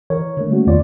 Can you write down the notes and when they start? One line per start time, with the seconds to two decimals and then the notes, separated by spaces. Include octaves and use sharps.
0.10 E3 A#4 C#5
0.37 D3 A3
0.51 G3 A3 A#3 C#4 F#4
0.67 E2 D3 D#3 F4 C#5 D5